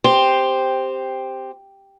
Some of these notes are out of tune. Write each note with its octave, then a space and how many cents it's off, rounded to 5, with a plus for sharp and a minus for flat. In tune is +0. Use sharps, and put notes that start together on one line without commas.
C4 +0 G4 +5 C5 +0